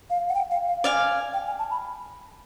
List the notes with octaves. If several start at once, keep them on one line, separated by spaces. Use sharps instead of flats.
F5
F#5
G5
F5
F5
D5 F5 G#5
G5
G#5
A5
B5